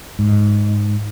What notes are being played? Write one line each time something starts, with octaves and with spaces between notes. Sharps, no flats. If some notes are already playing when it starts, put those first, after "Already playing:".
G#2